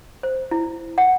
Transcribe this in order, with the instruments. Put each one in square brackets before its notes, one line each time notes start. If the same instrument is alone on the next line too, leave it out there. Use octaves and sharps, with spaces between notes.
[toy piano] C5
E4
F#5